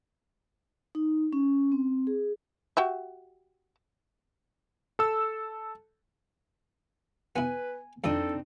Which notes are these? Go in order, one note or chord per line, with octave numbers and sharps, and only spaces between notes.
D#4
C#4
C4
G#4
F#4 G4 E5
A4 E6
B3 E4 B4 G#5
F2 C4 D4 D#4 A4 D#5 D#6